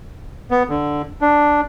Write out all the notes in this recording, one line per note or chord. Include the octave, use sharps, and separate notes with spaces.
B3
D3
D4